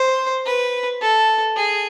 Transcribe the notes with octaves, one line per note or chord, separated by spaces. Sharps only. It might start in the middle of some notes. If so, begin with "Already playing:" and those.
Already playing: C5
B4
A4
G#4